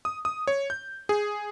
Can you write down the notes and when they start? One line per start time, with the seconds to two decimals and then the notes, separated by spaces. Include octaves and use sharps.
0.05 D#6
0.25 D#6
0.47 C#5
0.70 G6
1.09 G#4